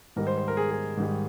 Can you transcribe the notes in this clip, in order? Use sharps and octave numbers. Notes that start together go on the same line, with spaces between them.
G#2 D#3 G3 A#4
C5
C5
A#4
G#4
G#4
G#2 D#3 G3